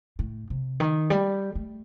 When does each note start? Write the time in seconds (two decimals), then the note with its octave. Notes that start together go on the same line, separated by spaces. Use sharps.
0.19 A2
0.50 C3
0.80 D#3
1.10 G3
1.55 A3